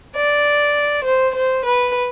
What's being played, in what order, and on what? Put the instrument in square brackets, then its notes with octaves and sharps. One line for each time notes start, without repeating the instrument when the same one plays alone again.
[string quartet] D5
C5
C5
B4